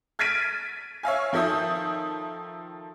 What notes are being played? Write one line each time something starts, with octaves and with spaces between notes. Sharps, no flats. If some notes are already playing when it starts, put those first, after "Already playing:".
F6 G#6 A6 B6 D7 D#7
C#5 E5 F5 G#5
D#3 F3 A4 E5 D#6 G6